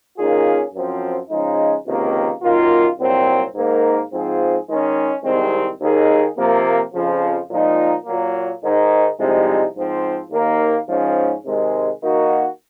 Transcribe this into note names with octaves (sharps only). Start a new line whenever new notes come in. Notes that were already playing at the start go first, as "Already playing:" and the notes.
D#3 A#3 C#4 F4 G#4
F#2 F3 C4
C#3 F3 G#3 D#4
C#2 C3 D#3 A#3
F#2 D#3 A#3 F4
C2 A#2 F#3 C4
G#2 D#3 A#3
G#2 F3 C4 F4 G#4
D#3 G#3 C#4
C2 C3 D#3 G#3 C4
D#2 D#3 A#3 D#4 G#4
C3 F3 A#3
F2 C#3 F3
A#2 F3 G#3 D#4
A#2 F#3 A#3
G#2 D#3 G#3 D#4
C2 C3 F3 G#3 D#4
G#2 F3 C4
D#2 D#3 A#3
G#2 F3 G#3 C#4
C3 D#3 G#3
D#3 A#3 D#4 F#4